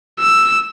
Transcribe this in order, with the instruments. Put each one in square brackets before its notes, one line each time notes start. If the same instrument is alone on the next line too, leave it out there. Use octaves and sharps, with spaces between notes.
[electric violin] E6